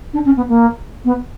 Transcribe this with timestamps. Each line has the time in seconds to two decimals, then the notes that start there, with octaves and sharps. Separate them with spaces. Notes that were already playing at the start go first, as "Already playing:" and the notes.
0.14 D4
0.25 C#4
0.37 B3
0.49 A#3
1.05 B3